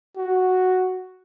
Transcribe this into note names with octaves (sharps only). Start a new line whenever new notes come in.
F#4